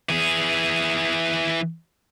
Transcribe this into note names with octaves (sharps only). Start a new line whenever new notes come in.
E3 G#4